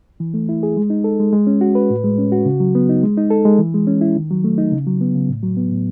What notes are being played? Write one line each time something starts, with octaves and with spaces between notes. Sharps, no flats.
E3
A3
E4
G#4
G#3
D#4
A4
G#3
G#3
C#4
F#4
B4
A2
G#3
C#4
F#4
C#3
F#3
B3
D#4
G#3
D#4
A4
G#3
E3
G#3
C#4
E4
D#3
F#3
A3
D#4
C#3
F#3
B3
C#3
A2
F#3
B3
A2